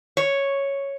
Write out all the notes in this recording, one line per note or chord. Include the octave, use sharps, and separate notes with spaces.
C#5